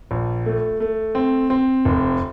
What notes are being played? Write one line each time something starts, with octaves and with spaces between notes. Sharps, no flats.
A#1
A3
A3
C4
C4
F1